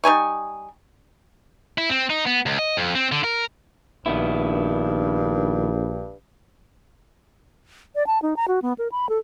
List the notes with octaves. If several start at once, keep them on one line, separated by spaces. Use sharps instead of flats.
G3 D#4 G#5 C#6
E4
C4
D#4
B3
C#2
D#5
F2
C4
D3
A#4
A#1 G2 D#3 B3 E4
D5
A5
D#4
A#5
F#4
B3
A#4
B5
A4